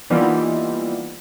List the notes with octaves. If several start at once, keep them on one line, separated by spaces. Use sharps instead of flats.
E3 G3 A#3 B3 D#4 F4